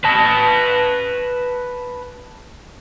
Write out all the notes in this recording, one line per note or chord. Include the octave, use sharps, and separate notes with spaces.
B4 A5